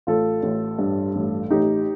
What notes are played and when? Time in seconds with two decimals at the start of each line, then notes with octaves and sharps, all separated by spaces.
0.07 A1 F4 A4
0.43 A1
0.79 G2
1.15 A1
1.50 A1 D#4 G4